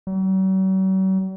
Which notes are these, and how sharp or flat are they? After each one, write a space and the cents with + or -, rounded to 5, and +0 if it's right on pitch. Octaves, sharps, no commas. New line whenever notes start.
F#3 +45